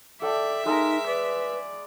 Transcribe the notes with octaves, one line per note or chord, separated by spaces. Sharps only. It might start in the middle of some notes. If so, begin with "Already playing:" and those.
A4 D5 E5 G5
G#3 D#4 A#4 A#5
B4 D5